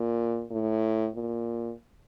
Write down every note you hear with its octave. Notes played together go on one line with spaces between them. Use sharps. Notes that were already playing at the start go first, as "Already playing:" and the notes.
Already playing: A#2
A2
A#2